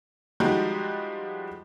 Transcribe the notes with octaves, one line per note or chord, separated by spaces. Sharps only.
F3 G3 G#3 D#4 F#4 G4